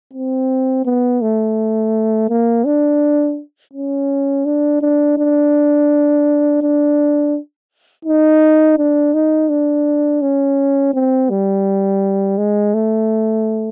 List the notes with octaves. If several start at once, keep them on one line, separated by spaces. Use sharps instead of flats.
C4
B3
A3
A#3
D4
C#4
D4
D4
D4
D4
D#4
D4
D#4
D4
C#4
C4
G3
G#3
A3